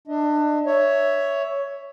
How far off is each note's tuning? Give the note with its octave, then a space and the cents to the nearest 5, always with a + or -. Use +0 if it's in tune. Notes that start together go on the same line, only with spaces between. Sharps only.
D4 +25 D#5 +35
C#5 +10 E5 +0